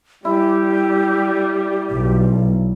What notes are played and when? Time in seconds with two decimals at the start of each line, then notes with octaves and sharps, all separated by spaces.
0.25 G3 E4 G4
1.91 B1